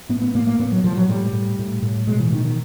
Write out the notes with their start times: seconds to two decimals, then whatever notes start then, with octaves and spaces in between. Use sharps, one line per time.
0.09 A2 B3
0.22 B3
0.35 A2 A#3
0.47 A#3
0.59 A2 B3
0.72 F#3
0.84 A2 F3
0.96 F#3
1.09 A2 G3
1.33 A2
1.59 A2
1.82 A2
2.07 B2 G#3
2.20 E3
2.33 B2 D#3
2.45 D#3